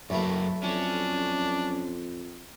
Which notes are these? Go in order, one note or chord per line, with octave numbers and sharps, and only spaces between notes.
B1 F#2 A3 A#3 E4
F2 C#4 D4